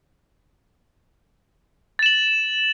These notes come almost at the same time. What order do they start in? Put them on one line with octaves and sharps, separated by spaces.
A6 E7 F#7